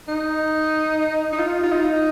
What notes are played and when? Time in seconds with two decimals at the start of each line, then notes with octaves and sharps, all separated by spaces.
0.09 D#4
1.33 D#4
1.39 F4
1.63 F4
1.72 D#4